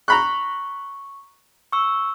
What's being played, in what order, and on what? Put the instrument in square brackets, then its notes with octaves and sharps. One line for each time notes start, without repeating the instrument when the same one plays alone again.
[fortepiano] A#5 B5 F#6 [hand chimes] C#6
[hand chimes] C#6 E6